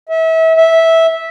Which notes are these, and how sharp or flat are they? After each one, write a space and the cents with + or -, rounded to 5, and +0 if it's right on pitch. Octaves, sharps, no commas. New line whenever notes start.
E5 -30
E5 -10